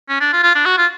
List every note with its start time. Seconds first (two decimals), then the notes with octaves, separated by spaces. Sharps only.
0.09 C#4
0.21 D4
0.33 F4
0.43 F4
0.55 D4
0.66 F#4
0.78 F4